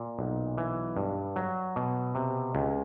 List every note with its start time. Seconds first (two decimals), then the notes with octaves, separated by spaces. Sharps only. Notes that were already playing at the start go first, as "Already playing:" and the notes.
Already playing: A#2
0.19 B1
0.58 E3
0.96 G2
1.36 F#3
1.76 B2
2.15 C3
2.55 C#2